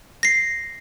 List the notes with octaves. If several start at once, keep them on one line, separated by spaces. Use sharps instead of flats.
A#6 C7